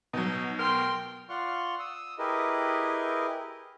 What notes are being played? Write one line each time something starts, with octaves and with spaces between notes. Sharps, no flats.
B2 F#3 D#4
A#4 G5 C6
F4 D5 F#5 C6 C#6 F6
D#6 E6
E4 G4 G#4 A#4 B4 D#5